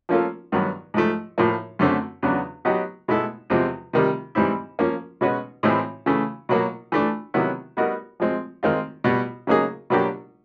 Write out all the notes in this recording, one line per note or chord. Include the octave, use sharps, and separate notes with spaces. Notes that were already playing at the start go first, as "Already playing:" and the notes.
F3 A#3 C#4 F4 A4
G2 D#3 F#3 B3
G#2 F3 A3
A2 F3 A#3
F#2 D3 F#3 A3 C4
E2 C#3 F#3 B3 D4
F#3 B3 D#4 G4
B2 G#3 B3 E4 A4
E2 C3 F3 G#3 C4
C3 D#3 G3
G#2 E3 G3 C4 E4
F3 A#3 C#4
B2 G#3 C#4 F#4 B4
A2 E3 G#3 C4 E4
C#3 E3 A3
B2 F#3 A#3
E3 A3 D4
C3 D#3 F#3 B3 E4
G3 B3 D#4 F#4 A#4
F3 G#3 C4
D#3 G#3 C4 F4
B2 G3 B3
C#3 F#3 A#3 D#4 G#4
B2 F#3 A#3 D4 G4